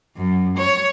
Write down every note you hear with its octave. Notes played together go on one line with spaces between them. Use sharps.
F#2
C#5